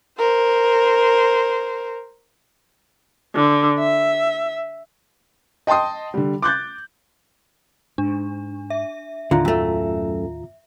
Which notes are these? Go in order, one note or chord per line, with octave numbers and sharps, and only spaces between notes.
A#4 C5
D3
E5
D#5 G5 A5 C6 D#6
D3 G3
D6 F#6 G6 A6
G#2 D4
E5
D#2 A2 D3 D#3 F4 A#5
F#2 A3